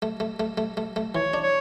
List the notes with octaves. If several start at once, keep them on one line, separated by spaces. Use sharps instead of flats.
A3
A3
A3
A3
A3
A3
E3 C#5
D4
C#5